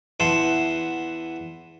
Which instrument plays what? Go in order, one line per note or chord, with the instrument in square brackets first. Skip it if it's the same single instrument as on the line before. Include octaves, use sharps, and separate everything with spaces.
[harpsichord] E2 E3 F#5 A5 C6 D6